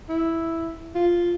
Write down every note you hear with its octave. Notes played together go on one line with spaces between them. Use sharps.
E4
F4